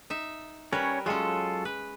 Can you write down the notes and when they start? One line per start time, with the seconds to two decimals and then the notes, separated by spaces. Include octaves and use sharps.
0.10 D#4 E5
0.73 G3 C#4 A#4 B4 C#5
1.06 F#3 G#3 C#4 F4 A4
1.65 B4